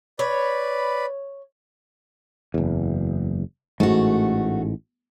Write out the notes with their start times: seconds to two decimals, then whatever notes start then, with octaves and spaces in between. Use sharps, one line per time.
0.19 B4 C#5 D5 B5
2.54 F#1 E2
3.80 A1 G#2 A3 F#4